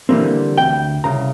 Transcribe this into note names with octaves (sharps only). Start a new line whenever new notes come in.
D3 E3 G3 A#3 C4
D2 G5
C2 C#3 A#5